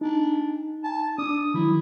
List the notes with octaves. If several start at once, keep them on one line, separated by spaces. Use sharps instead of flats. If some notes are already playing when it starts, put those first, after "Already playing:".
D4 D#4
A5
D4 D#6
D#3 F#3 E4